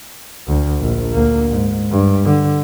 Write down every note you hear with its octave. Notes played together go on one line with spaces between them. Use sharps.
D2
A#1
D2 A#3
G#2
G2
D3